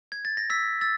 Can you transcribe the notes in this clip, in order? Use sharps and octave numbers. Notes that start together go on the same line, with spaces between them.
G#6
A6
A#6
E6 B6
E6 A6